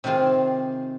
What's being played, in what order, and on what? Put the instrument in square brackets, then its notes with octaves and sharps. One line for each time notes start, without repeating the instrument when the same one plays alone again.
[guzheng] C3 D#3 C4 F4 G#4